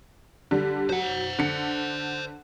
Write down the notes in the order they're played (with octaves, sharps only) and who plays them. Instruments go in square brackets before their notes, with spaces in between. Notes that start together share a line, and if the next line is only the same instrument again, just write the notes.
[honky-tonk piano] D3 G3
[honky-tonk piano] F#3 [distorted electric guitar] C5 F#5
[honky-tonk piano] D3 C#7